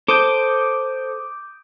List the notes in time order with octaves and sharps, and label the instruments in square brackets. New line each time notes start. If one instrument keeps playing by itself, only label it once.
[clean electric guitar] A4 C5 [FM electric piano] D6 D#6 G6